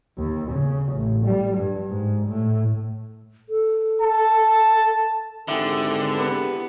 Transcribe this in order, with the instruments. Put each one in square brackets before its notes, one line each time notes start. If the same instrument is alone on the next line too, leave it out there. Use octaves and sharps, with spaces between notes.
[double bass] D#2
C#3
A1
G3
G2
G#2
A2
[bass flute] A4
[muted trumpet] A5
[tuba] G#1 [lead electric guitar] D3 [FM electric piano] E4 G4 G#4
[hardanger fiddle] B3